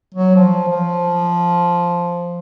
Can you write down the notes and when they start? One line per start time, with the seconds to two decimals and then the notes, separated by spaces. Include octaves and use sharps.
0.15 F#3
0.36 F3
0.68 F3